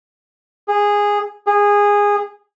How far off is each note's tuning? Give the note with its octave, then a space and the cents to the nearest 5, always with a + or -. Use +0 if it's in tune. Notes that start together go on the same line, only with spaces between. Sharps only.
G#4 -15
G#4 -20